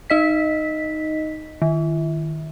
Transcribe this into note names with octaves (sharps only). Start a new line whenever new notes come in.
D#4 D#5 B6
D#3